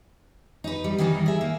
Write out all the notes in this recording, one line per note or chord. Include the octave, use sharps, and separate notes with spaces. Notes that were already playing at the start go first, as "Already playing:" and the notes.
D#4 B4
G3
D#3 E3 G3 D4 D#4
G#4 E5
A#3